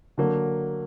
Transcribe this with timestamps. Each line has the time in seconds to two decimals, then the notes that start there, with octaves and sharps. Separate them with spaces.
0.18 D3 F#3 A#3